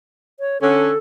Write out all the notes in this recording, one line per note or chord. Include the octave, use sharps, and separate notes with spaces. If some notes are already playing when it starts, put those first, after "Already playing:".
C#5
D3 C#4 A4